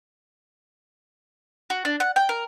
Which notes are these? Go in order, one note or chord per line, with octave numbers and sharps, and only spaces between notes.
F#4
D4
F#5
G5
A#4